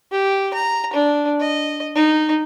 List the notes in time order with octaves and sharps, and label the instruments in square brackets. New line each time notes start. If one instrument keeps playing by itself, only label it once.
[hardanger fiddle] G4
A#5
D4
D#5
D#4